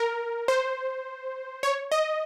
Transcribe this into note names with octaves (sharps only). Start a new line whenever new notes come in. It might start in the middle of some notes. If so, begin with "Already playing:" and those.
Already playing: A#4
C5
C#5
D#5